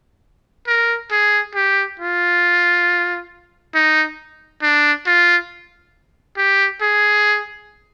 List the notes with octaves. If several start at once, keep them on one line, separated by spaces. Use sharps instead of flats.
A#4
G#4
G4
F4
D#4
D4
F4
G4
G#4